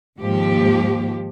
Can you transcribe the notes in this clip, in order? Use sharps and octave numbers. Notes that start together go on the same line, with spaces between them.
D#2 G#2 F3 G4